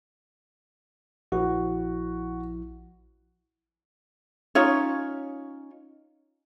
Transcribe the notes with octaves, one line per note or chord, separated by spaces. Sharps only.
A#1 F3 E4 F#4
C#4 D#4 F4 C#5